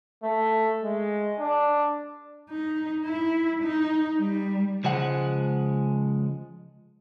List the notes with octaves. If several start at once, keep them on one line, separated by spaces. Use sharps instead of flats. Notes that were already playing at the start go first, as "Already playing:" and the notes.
A3
G#3
D4
D#4
E4
D#4
G3
C#2 F3 G#3 F#5